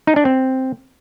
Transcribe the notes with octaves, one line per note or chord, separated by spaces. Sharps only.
D#4
D4
C4